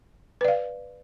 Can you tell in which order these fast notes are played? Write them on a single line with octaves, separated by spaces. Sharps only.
B4 D5 F5